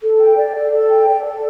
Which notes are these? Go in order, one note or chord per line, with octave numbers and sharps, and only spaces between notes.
A4
G5
D5
A4
A4
G5
D5
A4